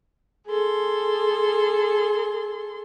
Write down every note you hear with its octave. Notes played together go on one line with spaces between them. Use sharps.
G#4 A4 C6